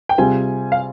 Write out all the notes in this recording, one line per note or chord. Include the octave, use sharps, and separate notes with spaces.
G5
C3 G3 C4 F4 G#4 G#5
F5